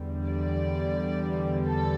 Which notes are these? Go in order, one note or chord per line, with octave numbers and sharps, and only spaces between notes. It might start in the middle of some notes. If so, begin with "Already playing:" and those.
Already playing: E2 D3 G3
D5
A4